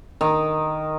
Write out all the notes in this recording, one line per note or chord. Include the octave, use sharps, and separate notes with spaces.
D#3